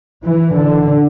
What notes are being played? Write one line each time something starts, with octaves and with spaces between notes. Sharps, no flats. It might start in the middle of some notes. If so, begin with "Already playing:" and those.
E3
D3